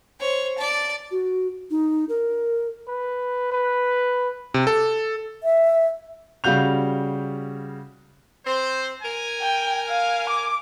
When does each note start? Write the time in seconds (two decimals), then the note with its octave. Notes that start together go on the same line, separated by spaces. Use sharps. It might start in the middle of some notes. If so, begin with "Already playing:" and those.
0.20 C5 C#5
0.58 D5 A5
1.11 F#4
1.71 D#4
2.09 A#4
2.88 B4
3.52 B4
4.54 C3
4.67 A4
5.43 E5
6.44 C#3 G3 F#4 F5 G6 F7
8.46 C4 C5
9.02 A#4 G#5
9.41 G5
9.89 F5
10.29 D6